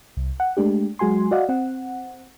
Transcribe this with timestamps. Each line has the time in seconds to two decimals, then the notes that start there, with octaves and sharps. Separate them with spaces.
0.17 C2
0.40 F#5
0.57 G#3 A3 D4 G4
0.99 F#3 G#3 F#4 G#5 C6
1.31 F#4 D5 D#5 F5 F#5
1.49 C4 F#5